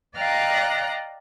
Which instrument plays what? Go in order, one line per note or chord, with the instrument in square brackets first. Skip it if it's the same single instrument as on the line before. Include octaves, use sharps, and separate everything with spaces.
[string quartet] D5 D#5 F5 G5 A#5 F#6